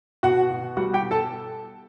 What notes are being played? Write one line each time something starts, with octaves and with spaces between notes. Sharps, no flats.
B2 F#4 F#5
B2
G3 F#4 F#5
G4 G5
B2
A4 A5